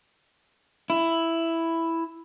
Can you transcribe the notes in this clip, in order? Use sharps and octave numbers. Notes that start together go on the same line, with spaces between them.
E4